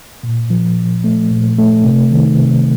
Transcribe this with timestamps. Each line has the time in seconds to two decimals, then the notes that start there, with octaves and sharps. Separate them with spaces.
0.23 A#2
0.50 F3
0.77 A#2
1.04 A3
1.31 A#2
1.59 A3
1.85 C3
2.11 D#3
2.38 C3